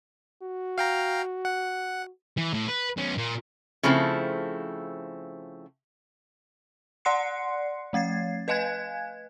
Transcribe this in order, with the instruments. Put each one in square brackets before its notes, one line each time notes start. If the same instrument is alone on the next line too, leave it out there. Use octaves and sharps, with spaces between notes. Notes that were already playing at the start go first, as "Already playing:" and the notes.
[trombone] F#4
[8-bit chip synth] F5 G5 A#5
F#5
[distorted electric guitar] E3
A2
B4
B1 C#4
A#2
[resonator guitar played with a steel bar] C#3 F3 A3 C4 E4
[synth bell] D5 F#5 C6 F#6 C7 C#7
F3 A3 G#6 A6 C7
B4 D#5 F5 G#5 F#6 G#6